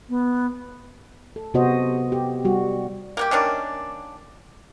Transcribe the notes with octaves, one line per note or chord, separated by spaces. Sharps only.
B3
A4
C3 B3 F#4 C5 D#5
G4
G3 F#4
A#3 F#4 G4
D#3 A#3 C#4 D4